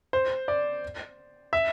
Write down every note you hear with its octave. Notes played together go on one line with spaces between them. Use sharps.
C5
D5
E5